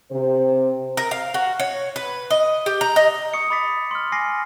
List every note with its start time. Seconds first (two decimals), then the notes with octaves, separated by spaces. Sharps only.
0.11 C3 C5
0.97 A#4
1.11 F5
1.34 F#4
1.60 C#5
1.96 B4
2.30 D#5
2.66 G4
2.81 A#5
2.96 D#5
3.34 C#6 D#6 C#7
3.50 B5 D6 A6 B6
3.91 C6 F6
4.12 G#5 D6 A#6 C7